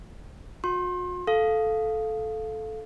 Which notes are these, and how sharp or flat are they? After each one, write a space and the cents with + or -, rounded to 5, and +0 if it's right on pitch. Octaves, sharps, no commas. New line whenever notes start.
F#4 -45 C6 +35
A4 -10 F5 +0